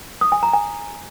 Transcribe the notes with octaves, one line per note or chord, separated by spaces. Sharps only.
D#6
G#5
A#5
G#5